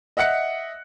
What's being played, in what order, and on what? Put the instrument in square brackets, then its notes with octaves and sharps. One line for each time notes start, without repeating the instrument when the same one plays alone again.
[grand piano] D#5 E5 F#5 F#6 C#7